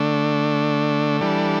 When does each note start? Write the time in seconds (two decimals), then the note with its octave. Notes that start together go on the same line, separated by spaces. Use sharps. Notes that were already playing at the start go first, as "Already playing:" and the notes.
Already playing: D3 A3 D4
1.21 E3 G3 D4 A4